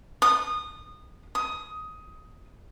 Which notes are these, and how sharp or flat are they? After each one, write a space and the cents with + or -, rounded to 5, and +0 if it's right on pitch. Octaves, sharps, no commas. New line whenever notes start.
D#6 -20
D#6 +15